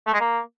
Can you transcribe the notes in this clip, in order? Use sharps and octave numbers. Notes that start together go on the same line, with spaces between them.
A3
G#3
A#3